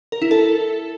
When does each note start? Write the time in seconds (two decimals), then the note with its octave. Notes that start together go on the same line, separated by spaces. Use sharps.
0.12 A#4
0.22 E4
0.31 A4